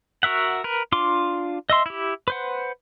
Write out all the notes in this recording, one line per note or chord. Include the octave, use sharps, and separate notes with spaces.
F#4 A#4 E5 F#5
A#4 B4
D4 F4 C6 D6
D#5 E5 C6
E4 G4
B4 C5 F#5